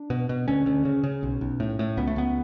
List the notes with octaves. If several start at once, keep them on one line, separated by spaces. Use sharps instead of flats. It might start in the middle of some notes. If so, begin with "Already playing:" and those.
Already playing: D4
B2
B2
D2 C#4
D2
C#3
C#3
B1
B1
A2
A2
C#2 B3
A3
C#2 B3